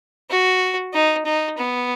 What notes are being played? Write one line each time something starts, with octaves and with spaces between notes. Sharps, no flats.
F#4
D#4
D#4
B3